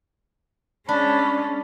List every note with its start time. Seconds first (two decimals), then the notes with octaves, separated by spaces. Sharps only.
0.89 G#3 C#4 D4 A5 B5